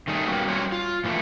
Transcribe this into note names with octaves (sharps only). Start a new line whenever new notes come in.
D#3 G3 A3 G#4
G3 A#3 B3 C#4 F#4 G4
F#3 G3 C#4 C5 C#5 F5
F4
A2 E3 F3 A3 A#3